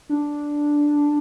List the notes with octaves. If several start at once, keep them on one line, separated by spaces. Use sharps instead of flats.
D4